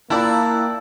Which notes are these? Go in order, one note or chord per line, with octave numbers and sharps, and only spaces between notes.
A#3 E4 F4 D5 G5 A5 A#5 F#6